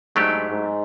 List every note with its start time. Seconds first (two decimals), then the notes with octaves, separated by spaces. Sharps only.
0.16 G#2 F#3 A3 D4 G4
0.50 G#2